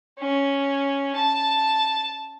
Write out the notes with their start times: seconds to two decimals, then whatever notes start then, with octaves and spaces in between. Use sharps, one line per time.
0.19 C#4
1.15 A5